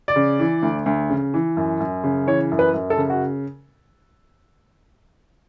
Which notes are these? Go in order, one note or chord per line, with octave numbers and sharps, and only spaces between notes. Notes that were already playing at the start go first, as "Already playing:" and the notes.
D5
C#3
E3
D2
D2
C#3
E3
F#2
F#2
C#3
E3 C#5
F#2
B4
F#2
A4
C#3
F#4